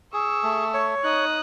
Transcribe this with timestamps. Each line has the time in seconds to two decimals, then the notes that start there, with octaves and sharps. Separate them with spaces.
0.13 G#4 C#6 E6
0.43 A3
0.74 C#5
1.04 D#4 D#6 F#6